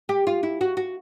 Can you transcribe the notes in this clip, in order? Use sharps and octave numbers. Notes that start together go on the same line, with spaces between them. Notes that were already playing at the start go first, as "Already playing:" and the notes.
G4
F4
E4
F#4
F#4